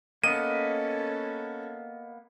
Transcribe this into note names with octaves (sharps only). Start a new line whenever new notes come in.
A#3 B3 C#4 A4 D#5 D#7